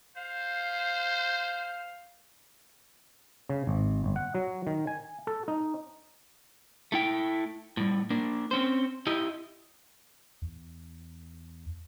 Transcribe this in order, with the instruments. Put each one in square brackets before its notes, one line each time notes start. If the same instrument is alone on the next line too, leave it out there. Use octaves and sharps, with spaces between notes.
[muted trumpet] C5 [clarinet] F5
[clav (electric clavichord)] C#3
G#1
G1
F#5
F#3
D#3
G#5
A4
D#4
[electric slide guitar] A3 E4 G5
A2 G3
A#3 D4
C4 C#4 C5
E4 G4 D#5
[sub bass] E2